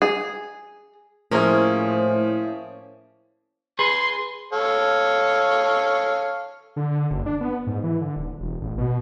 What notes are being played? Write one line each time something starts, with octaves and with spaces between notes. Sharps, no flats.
G#4
A2 F3 A#3 C#4 E4 G#4 C5 E5
G#4 B4 C6
A4 C#5 F5
D3
F#1
D4
B3
G#2
E3
D3
D#1
E1
A1
B2